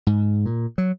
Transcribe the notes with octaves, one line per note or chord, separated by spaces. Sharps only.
G#2
A#2
F#3